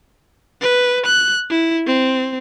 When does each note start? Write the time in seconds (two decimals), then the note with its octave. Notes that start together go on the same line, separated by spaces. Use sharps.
0.61 B4
1.06 F#6
1.50 E4
1.87 C4